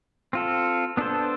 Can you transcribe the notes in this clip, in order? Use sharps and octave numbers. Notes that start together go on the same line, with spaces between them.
C4 F4 A4
B3 D4 A4 C5